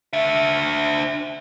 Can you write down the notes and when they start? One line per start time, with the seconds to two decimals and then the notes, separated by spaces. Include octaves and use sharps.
0.13 D4 E5